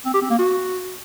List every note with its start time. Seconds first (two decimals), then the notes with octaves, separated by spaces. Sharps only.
0.06 C4
0.14 G4
0.22 C4
0.30 A#3
0.39 F#4